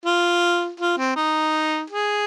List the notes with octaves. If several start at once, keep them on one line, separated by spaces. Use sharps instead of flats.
F4
F4
C4
D#4
G#4